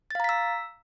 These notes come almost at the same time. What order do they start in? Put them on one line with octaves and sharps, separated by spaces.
A6 F5 A#5 B6 E6